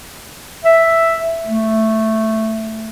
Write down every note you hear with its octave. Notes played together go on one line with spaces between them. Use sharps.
E5
A3